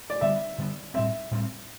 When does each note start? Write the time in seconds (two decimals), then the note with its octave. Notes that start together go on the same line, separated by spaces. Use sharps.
0.10 D5
0.21 D3 G3 B3 E5
0.58 D3 G3 B3
0.94 A2 G3 C4 E5
1.31 A2 G3 C4